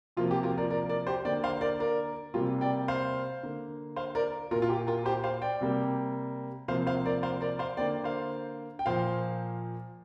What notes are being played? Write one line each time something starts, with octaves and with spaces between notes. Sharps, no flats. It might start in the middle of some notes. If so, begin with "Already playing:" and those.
C3 F3 A#3 F4
G4
F4 A#4
A#4 D5
A#4 D5
A#4 D5
G4 C5
D3 A#3 D5 G5
C5 F5
A#4 D5
A#4 D5
C3 G3 A#3 F4
D5 G5
C5 F5
D3 A#3
C5 F5
A#4 D5
A#2 A#3 F4 A#4
F4
G4
F4 A#4
G4 C5
C5 F5
D5 G5
C3 G3 A#3
C3 F3 A#3 C5 F5
C5 F5
A#4 D5
C5 F5
A#4 D5
C5 F5
D3 A#3 D5 G5
C5 F5
G5
A#2 F3 A#3 C5 F5